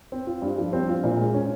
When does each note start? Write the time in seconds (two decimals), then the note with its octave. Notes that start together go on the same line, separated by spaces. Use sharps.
0.12 C4
0.27 F4
0.42 G2
0.58 F3
0.73 C4
0.89 F4
1.04 A#2
1.18 G#3
1.34 C#4